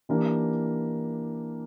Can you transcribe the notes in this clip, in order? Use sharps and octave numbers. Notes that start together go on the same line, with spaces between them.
E3 A#3 D4 G4 A#4